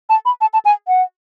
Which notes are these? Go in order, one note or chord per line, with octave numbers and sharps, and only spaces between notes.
A5
B5
A5
A5
G#5
F#5